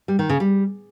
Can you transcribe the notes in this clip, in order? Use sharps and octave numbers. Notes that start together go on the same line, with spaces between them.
G3
D#3
C#3
G3